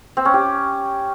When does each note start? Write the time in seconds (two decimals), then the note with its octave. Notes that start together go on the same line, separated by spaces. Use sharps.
0.17 C4
0.25 C#4
0.34 G4